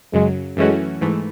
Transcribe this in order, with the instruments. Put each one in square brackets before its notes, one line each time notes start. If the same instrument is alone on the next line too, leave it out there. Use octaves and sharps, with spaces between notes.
[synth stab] F#2 C#3 F#3 [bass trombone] G#3
[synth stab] F#2 E3 A3 C#4 F#4 [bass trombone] G#3
[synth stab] G#2 E3 A3